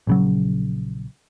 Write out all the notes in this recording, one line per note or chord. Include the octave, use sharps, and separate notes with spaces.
A#1 C#3 F#3